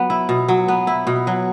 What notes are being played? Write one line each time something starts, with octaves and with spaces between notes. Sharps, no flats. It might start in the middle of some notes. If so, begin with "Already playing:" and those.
Already playing: F#3 B3
E4
B2
F#3
B3
E4
B2
F#3